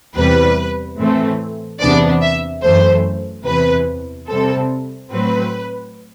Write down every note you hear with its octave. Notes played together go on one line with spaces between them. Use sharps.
E2 C3 E3 G3 B4
A2 E3 A3 C4
E2 C3 E3 B3 D4 D5
E5
F#2 E3 A3 C5
E2 C3 E3 B4
C3 G3 C4 A4
A2 F#3 C4 B4